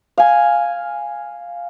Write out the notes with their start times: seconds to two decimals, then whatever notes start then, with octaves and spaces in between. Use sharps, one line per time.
0.18 F5 G#5